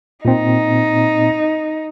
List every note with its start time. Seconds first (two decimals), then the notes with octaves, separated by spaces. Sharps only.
0.25 A#2 C4 D#4